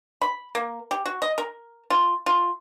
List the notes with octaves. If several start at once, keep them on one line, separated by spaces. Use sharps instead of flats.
B5
A#3
G4
F#4
D#5
A#4
F4
F4